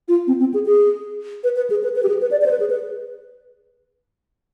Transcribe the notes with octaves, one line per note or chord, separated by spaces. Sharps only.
F4
C4
C4
G#4
G#4
B4
B4
G#4
B4
B4
G4
G#4
B4
D5
D5
C5
B4
G#4
B4